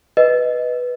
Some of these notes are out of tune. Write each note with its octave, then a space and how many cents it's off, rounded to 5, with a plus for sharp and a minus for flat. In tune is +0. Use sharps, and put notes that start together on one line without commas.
B4 +0 D#5 +0